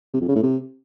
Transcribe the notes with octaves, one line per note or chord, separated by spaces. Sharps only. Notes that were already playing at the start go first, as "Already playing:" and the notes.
C3
F2
C#3
A2
C3